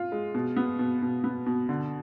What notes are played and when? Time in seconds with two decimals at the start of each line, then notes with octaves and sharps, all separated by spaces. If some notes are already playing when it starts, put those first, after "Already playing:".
Already playing: F4
0.12 G#3
0.35 B2
0.56 B3
0.79 B2
1.02 B2
1.24 B3
1.46 B2
1.69 D3